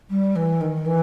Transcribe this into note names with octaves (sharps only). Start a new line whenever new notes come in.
G3
E3
D#3
E3